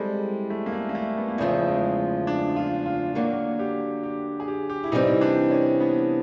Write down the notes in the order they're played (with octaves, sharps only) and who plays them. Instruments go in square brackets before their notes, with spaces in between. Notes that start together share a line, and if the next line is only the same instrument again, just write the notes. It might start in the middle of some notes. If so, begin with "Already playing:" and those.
Already playing: [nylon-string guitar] G3 C4 E4 A4 [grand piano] G#3
[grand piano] A3
A#3
A3
A#3
A3
B3
A#3
[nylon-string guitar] E2 C#3 F3 [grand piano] A3
[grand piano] G#3
D4
F4
F4
[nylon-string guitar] D3 F#3 A#3 [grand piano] F#4
[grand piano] G4
G4
G#4
G4
G4
E4
[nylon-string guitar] C3 E3 G3 C4 [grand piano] D#4
[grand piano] D4
C#4
B3